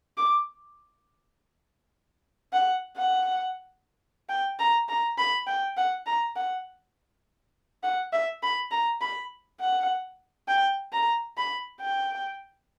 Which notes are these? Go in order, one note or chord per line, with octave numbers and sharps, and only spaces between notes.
D6
F#5
F#5
G5
A#5
A#5
B5
G5
F#5
A#5
F#5
F#5
E5
B5
A#5
B5
F#5
G5
A#5
B5
G5